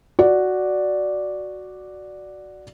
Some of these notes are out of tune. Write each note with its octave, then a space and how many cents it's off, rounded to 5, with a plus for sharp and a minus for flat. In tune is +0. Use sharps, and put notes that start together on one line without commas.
F#4 +0 D5 +0